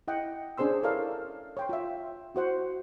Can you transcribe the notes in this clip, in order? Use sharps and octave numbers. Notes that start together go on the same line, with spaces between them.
E4 D#5 F#5 G5
C#4 D4 G#4 C5 C6 E6
E4 A4 A#4 C#5 D5 F5
C#5 G5 C6
F4 E5
E4 F#4 C5 F#5